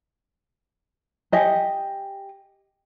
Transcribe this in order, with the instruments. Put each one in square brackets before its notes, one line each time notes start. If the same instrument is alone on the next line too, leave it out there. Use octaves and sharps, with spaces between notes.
[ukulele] G4 D#5 G#5